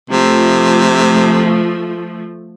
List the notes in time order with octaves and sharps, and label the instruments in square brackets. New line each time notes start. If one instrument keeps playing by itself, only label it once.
[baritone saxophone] C3 [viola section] F3 A3